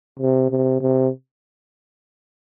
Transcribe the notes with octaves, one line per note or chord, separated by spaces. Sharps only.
C3
C3
C3